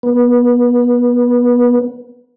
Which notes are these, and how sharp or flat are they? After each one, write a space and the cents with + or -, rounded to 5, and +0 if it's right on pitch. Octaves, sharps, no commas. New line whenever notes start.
B3 -25